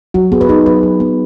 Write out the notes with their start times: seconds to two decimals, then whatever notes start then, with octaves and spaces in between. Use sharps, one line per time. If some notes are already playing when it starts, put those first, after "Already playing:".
0.14 F#3 F#4
0.32 B3 G#4
0.41 B4
0.49 D#4 G#4
0.66 F#3 B4
0.83 F#3
1.00 B3